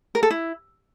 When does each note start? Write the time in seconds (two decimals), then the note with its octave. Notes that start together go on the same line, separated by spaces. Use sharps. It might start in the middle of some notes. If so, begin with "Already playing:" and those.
0.15 A#4
0.23 A4
0.30 E4